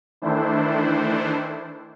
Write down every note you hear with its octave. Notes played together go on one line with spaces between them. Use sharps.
D#3 E3 A3 D4 E4 C5